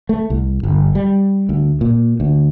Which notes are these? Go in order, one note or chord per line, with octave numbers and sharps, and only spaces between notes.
A3
C2
G1
G3
D2
A#2
D2